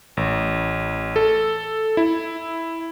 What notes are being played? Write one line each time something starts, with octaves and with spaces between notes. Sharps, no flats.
A1
A4
E4